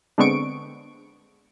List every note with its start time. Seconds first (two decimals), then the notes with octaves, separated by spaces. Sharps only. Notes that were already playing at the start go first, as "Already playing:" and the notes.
0.18 D3 G#3 B3 C4 C#6 D7